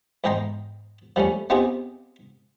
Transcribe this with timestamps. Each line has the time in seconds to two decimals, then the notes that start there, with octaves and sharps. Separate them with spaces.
0.24 E2 G#2 D#5 G5 A#5 C6
1.16 F3 G3 A3 C#4
1.50 B3 C4 D#4 F4 G4 G#4